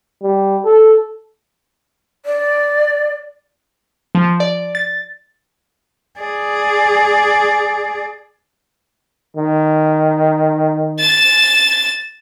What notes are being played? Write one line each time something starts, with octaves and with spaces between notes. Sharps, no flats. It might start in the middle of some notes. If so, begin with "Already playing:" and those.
G3
A4
D5
F3
D5
A6
G#4 D5
D#3
A6 E7